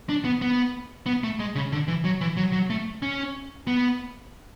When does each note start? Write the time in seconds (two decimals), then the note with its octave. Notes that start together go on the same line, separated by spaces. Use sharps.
0.09 D4
0.25 B3
0.42 B3
1.06 B3
1.24 A3
1.40 G#3
1.55 C#3
1.72 D3
1.88 E3
2.05 F#3
2.21 E3
2.37 F#3
2.52 F#3
2.70 A3
3.02 C#4
3.67 B3